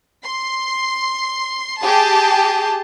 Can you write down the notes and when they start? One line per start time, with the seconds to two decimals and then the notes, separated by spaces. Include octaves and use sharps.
0.25 C6
1.82 G4 G#4 A5